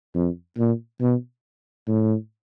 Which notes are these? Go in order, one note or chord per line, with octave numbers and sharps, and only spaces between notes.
F2
A#2
B2
A2